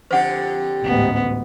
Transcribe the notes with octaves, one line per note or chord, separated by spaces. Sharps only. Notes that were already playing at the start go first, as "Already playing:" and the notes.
F2 D3 G4 C5 F#5
A1 D2 G#2 B3